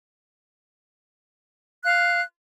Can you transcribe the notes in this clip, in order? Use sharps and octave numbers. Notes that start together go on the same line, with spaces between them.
F5 F#6